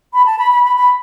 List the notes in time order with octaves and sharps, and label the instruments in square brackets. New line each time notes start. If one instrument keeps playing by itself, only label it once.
[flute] B5
A5
B5
B5
B5
B5